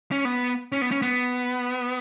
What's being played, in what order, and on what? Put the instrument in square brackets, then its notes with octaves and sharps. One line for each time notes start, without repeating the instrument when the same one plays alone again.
[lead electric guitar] C#4
B3
C#4
B3
C#4
B3